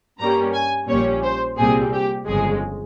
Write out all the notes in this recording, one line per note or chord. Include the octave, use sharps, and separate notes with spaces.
G2 G3 A#3 C#4 A#5
G#5
A#1 A#2 G3 C#4 C#5
C5
C2 A#2 G3 C4 G#4
G4
G1 F2 C#3 G#3 G#4